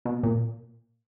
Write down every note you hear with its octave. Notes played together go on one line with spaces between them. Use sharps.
B2
A#2